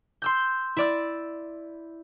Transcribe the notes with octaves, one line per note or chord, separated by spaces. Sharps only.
C6 E6 G6
E4 D5 E6